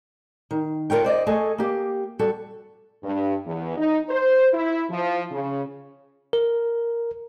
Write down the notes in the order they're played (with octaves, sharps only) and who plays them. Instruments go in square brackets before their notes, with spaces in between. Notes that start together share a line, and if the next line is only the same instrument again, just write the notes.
[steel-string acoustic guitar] D#3
D4 F4 A#4 C#5 G5
C5 D5 D#5
A3 G#4 A4 C#5 D#5 G#5
A#3 G4
G3 F#4 A4
[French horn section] G2
E2
D#4
C5
E4
F3
C#3
[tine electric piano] A#4